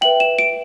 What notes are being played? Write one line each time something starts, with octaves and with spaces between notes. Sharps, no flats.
B4 E5 G5 F#7
E7
D7